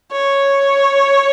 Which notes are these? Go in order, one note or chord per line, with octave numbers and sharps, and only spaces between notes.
C#5